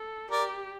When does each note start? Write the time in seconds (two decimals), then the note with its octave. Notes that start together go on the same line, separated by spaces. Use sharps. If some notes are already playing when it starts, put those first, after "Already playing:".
Already playing: A4
0.31 G4 A#4 D5